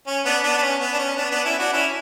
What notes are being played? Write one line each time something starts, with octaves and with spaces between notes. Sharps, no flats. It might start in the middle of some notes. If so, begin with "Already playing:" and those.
C#4
B3 D4
B3 D4
D4
C#4
B3
D4
C#4
B3 D4
B3 D4
C#4 E4
D4 F#4
C#4 E4